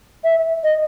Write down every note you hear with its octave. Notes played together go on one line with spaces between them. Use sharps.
E5
D#5